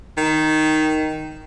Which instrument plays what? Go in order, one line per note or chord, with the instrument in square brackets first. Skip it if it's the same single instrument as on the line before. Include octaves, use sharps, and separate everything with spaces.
[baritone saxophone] D#3